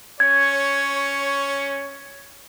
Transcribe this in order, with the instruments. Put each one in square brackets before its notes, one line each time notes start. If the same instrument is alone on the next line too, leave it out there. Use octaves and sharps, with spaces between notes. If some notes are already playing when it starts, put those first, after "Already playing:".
[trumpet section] C#4 C#5 [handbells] G#6